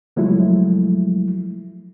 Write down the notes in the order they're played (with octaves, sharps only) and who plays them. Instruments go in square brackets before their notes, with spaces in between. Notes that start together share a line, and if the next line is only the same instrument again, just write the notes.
[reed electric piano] C#2 F3 F#3 G#3 A3 E4